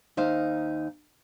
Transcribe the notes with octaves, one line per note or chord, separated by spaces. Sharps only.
D#2 D#4 C5 F5